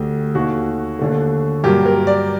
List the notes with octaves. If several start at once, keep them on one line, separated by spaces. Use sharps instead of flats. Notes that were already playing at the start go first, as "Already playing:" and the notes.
Already playing: D2 D3 A3 G4
D#2 D#3 A3 F#4
D#2 D3 A3
G2 F#3 A#3 G4
A#4
D5